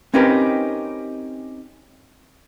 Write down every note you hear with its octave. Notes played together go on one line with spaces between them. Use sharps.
C4 C#4 D#4 G4 A#4 B4